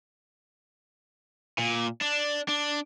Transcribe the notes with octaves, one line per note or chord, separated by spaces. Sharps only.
A#2
D4
D4